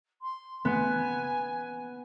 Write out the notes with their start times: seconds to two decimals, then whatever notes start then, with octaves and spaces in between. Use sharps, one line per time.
0.22 C6
0.65 B3 G#5